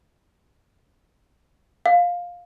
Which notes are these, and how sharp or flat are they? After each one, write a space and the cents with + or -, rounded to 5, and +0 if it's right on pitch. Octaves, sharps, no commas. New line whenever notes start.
F5 +15